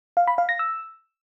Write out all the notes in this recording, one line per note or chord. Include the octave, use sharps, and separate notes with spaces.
F5
B5
F5
A#6
E6